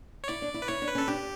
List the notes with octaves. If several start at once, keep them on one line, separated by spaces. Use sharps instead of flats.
C#5
E4 D5
D4
E4
B4
E4 C#5
D4
B4
C#4
A4
D4 G4